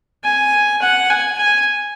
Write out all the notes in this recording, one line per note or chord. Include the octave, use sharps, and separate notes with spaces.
G#5
F#5
G#5
G#5